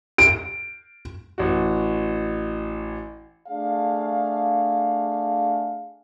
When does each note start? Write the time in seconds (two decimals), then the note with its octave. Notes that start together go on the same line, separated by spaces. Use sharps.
0.18 D7
1.38 A1 F#4
3.48 A3 D4 G#4 F5